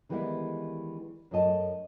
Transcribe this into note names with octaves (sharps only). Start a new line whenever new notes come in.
D#3 E3 G3 G#3 B3 E4
F#2 A3 A4 D#5 A5